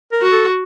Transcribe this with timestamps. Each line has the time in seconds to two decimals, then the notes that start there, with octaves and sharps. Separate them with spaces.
0.12 A#4
0.22 F#4
0.32 A4